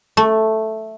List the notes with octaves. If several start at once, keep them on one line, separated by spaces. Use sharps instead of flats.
A3